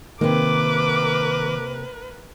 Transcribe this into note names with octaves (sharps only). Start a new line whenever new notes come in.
C3 D#3 A#3 A#4 B4 D6